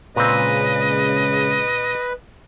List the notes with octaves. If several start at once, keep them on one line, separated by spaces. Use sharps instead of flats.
A#2 C#3 G#3 C4 B4 D#5